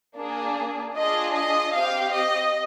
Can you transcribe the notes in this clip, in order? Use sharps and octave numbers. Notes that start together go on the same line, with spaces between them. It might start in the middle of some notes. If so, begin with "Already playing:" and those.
A#3 D4 G#4
D4 F4 G#4 D#5
D#5
C4 G4 F5
D#5